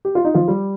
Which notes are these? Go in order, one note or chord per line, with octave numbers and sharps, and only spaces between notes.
G4
F4
D#4
F3 F4
G3 G4